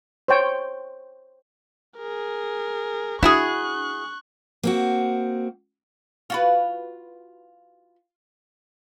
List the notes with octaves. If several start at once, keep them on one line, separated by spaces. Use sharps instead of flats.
C5 C#5 G5
G#4 A#4
D4 E4 F#4 G#4 C#6 F#6
A#3 C4 F#4
F4 F#4 B4